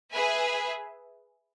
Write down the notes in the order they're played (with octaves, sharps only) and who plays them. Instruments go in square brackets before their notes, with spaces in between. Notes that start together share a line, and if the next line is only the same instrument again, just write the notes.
[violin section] G#4 B4 E5 G#5